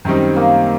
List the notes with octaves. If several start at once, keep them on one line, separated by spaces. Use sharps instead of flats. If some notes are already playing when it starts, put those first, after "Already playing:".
F#2 D#3 G3 C4 D#4
A#3